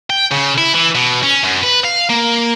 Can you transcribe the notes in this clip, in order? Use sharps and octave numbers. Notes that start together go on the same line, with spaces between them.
G5
C#3
E4
E3
B2
C#4
F#2
B4
F5
A#3